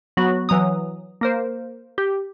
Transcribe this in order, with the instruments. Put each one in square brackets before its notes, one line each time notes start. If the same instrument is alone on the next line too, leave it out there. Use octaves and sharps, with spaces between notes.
[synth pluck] F#3 B3 F#4
E3 F#3 A#5 D#6
A#3 A#4 C5
G4